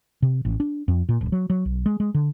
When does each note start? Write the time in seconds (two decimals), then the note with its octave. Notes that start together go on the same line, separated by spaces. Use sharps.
0.22 C3
0.45 A1
0.60 D4
0.88 F2
1.09 A#2
1.21 D1
1.32 F#3
1.50 F#3
1.65 B1
1.86 G#3
2.00 G#3
2.14 D3